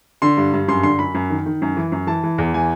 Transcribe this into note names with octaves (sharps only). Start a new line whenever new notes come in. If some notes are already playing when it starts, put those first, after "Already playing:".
D3 C6
G2
G2
F#2 C6
D3 C6
F#2 B5
F#2
D#3
D#3
F#2
E3
F#2
E3 A5
E3
E2
E3 G#5